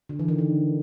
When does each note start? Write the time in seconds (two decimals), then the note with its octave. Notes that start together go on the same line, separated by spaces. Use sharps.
0.09 D3
0.19 E3
0.28 D#3
0.38 D3